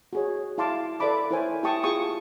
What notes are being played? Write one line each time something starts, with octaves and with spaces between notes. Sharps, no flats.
F#4 G#4 C#5
E4 F5 A5 C6 D6
A4 B4 D5 E5 B5 D6
E4 A#4 C5 C#5 G#5
E4 G4 G5 A5 C#6 D#6
F4 G#4 C#6 D#6